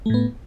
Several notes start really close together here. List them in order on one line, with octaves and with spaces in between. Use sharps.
A3 A2 B3